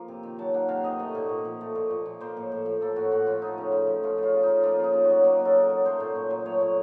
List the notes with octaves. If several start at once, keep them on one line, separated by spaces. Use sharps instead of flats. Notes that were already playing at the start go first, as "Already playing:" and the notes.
Already playing: F3 A#3
C3
D#3
F#3 A5
A#3 F#5
C3 F5
D#3 D#5
A3
A#2
A#2
F3
A3
A#2
A#2
F3
A#3 C5
A2
A2
F3
A#3 A4
A2 F#4
A2 F#4
F3 F4
A3 D#4
C#3
C#3
F3
A3 F4
C#3 F4
C#3
F3 D#4
A#3 F4
C#3 D#4
C#3
F#3 F#4
A#3 F#4
C#3
A4
C#3
F#3 A#4
A3 C5
A#2
A#2
F#3
A3 C#5
A#2